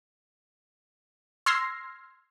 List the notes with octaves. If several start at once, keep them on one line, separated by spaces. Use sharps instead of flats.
C6 E6 F6 G#6 A#6 C7